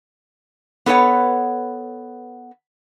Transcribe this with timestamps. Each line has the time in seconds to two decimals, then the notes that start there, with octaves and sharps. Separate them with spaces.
0.86 B3 A4 B4 C#5 F#5